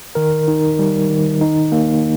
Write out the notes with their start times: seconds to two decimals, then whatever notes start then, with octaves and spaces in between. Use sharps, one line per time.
0.15 D#3 A#4
0.48 D#4
0.79 G3
1.10 D#3
1.41 D#4
1.72 A#3